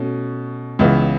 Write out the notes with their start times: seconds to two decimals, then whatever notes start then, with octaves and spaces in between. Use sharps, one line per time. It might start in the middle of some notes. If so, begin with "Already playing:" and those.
Already playing: B2 A3 C#4
0.79 C#2 C#3 E3 B3 E4